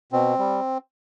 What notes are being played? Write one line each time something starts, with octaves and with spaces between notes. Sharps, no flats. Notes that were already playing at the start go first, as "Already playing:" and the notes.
B2 C4
G3